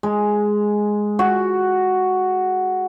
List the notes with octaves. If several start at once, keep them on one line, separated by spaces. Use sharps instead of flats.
G#3
F#4